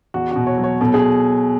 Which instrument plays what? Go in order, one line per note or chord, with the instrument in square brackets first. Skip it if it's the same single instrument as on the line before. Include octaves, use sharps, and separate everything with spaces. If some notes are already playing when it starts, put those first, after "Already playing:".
[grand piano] E2 F#4
B2 F#4
C#5
F#3
C#5
B2 A4
G#4